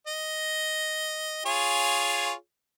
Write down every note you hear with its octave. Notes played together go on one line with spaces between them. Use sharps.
D#5
F4 G#4 C#5